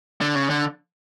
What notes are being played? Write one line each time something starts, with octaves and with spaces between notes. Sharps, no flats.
D3
C#3
D3